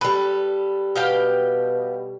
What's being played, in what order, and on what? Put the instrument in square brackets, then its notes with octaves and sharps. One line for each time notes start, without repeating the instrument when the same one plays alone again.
[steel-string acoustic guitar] G3 A4 [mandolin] B4
[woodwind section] B2 [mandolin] G4 F5 G5